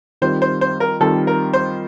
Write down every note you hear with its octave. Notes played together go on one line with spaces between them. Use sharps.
D#3 G3 C4 F4 C5
C5
C5
A#4
D#3 G3 C4 F4 A4
A#4
C5